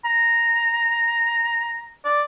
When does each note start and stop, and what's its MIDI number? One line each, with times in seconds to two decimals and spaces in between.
0.05 1.94 82
2.05 2.22 74